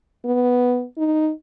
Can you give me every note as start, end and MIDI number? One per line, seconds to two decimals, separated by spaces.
0.25 0.84 59
0.98 1.31 63